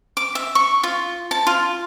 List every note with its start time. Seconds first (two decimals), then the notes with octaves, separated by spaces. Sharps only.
0.17 D6
0.35 E5
0.55 C#6
0.83 F4
1.31 A5
1.47 F4